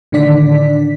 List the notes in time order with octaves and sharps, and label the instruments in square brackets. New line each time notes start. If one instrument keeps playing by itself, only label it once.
[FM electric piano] A2 D3 D#3 D4 D5 B6